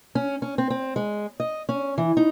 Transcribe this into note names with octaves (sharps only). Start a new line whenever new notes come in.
C#4
C#4
C4
C4
G#3
D#5
C#4
E3
D#4